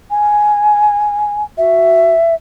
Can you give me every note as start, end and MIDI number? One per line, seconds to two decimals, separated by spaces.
0.10 1.43 80
1.57 2.13 66
1.57 2.34 76